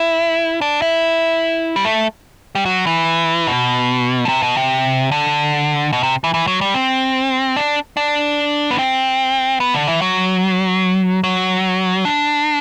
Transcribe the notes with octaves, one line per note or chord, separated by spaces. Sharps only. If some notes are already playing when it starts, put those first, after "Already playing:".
Already playing: E4
D4
E4
G3
A3
G3
F#3
E3
B2
D3
C3
B2
C3
D3
B2
C3
E3
E3
F#3
G3
C4
D4
D4
B3
C4
B3
D3
E3
F#3
F#3
D4